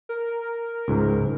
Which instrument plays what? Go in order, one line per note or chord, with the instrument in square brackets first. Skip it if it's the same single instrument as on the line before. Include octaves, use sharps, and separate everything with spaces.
[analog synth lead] A#4
[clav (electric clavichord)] C#2 G#2